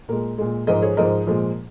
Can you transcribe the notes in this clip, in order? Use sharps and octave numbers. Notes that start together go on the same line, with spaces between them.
A#2 G#3 A#4
A#2 G#3
G#2 F3 G#3 A#4 D#5
G#4 C#5
G#2 F3 G#3 A#4 D#5
A#2 F3 G#3